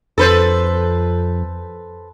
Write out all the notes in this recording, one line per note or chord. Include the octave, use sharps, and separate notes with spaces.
F2 A4 B4 C5